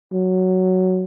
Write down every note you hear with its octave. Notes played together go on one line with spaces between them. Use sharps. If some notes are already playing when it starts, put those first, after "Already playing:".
F#3